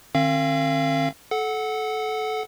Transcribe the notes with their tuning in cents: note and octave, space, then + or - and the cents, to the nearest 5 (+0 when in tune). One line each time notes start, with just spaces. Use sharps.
D#3 -40 C4 +45 F5 -30
A4 -25 F#5 +0